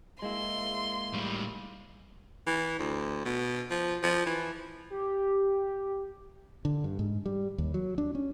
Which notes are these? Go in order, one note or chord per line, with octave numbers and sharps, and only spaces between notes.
G#3 A#3 E4 C6
A2 G3
E3
D2
B2
F3
F3
E3
G4
D3
G2
G#2
G3
D#2
F#3
D4
C#4